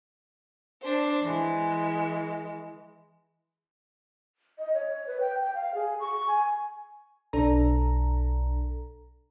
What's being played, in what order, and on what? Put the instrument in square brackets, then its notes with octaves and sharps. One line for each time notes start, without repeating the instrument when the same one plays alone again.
[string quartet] D4 C5
E3 G#3
[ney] D#5
C#5
B4
G5
G5
F5
G#4
C#6
G#5
[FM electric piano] B1 D4 A4 A#5